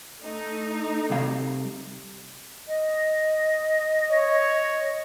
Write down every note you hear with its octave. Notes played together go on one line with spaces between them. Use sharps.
A3 D#4
C3 G3 F5
D#5
C#5